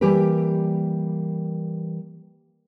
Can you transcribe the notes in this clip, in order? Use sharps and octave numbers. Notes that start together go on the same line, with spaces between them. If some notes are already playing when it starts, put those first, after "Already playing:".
E3 G3 A#3 G4 A#4 B4